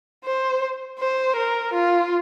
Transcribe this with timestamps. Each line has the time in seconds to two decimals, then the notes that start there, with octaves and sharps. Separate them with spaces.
0.25 C5
0.99 C5
1.36 A#4
1.73 F4